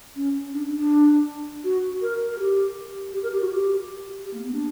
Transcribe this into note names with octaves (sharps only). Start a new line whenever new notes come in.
C#4
D4
D4
F#4
A#4
A#4
G4
G4
A#4
G4
F#4
G4
G4
A#3
B3
D4